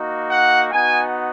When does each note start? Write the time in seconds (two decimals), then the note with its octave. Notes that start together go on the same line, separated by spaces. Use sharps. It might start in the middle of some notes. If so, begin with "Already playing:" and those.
Already playing: A#3 D#4 F#4
0.31 F#5
0.71 B3 D#4 F#4 G#5